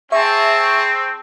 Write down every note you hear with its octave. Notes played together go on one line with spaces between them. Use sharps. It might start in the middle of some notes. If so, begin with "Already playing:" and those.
C4 G#4 E5 A5 C#6